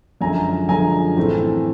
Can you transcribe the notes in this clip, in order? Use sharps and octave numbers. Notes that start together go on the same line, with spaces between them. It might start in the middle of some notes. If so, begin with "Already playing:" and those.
F#2 D3 F3 G#3 G#5 A#5
F#2 D3 F3 G#3 G#5 A#5
A2 E3 A3 C4